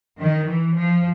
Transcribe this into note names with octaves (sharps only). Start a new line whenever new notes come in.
D#3
E3
F3